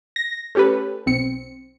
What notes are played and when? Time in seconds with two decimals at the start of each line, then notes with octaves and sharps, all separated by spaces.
0.16 A#6
0.55 A3 C#4 G4 A4 B4
1.06 B1 C4 C#7